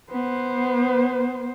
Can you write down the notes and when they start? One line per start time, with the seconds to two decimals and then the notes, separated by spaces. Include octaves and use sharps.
0.11 B3 C5